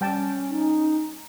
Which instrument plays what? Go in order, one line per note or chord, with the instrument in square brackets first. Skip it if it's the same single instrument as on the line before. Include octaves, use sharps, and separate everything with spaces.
[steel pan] G3 G5 A5 [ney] C#4
[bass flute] D#4